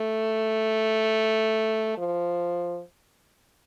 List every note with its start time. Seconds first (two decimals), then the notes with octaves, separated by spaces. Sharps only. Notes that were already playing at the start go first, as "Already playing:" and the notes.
Already playing: A3
1.98 F3